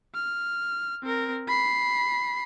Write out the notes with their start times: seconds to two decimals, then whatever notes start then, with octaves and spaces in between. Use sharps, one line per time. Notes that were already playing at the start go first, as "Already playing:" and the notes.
0.15 F6
1.03 C4 A#4
1.48 B5 C7